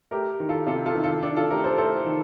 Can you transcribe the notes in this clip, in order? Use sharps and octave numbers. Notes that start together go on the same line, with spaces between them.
A3 G4 A#4
D#3
F4 A4
C3 F4 A4
F4 A4
D#3
F4 A4
D#3 D4
F4 A4
A3 G4 A#4
A4 C5
A3 A4 C5
D#3